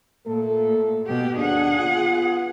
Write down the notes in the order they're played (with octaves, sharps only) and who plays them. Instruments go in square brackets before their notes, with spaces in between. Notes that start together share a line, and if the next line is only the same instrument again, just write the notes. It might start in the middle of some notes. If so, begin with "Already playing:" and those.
[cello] A#2 [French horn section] A3 A#3 A4
[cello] B2 G4
[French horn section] D#2 D4 [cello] G#4 F#5
[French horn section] B3 F4